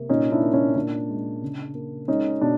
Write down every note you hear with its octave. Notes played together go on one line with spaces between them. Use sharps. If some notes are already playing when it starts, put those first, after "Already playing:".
Already playing: C3 A#3
A#2 C#4 D#4
D4 E4
A#3
C#4 D#4
A#2 D4
G#3
C#3
A#3
G#3 C#4 D#4
B2 D4